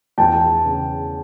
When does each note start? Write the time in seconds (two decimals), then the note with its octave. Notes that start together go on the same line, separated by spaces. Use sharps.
0.18 E2 G5 A5
0.65 C#3